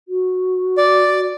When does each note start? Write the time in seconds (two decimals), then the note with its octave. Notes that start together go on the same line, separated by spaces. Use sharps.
0.08 F#4
0.78 D5